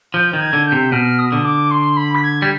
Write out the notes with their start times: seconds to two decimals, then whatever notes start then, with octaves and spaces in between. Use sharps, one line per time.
0.14 F3 G6
0.33 D#3
0.41 G#6
0.53 D3
0.66 G6
0.72 C3
0.92 B2 F6
1.19 D#6
1.32 D3
1.45 D6
1.71 C6
1.97 B5
2.15 B6
2.23 G#6
2.42 G3